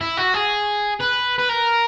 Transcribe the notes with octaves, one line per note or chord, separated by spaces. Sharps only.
E4
F#4
G#4
B4
B4
A#4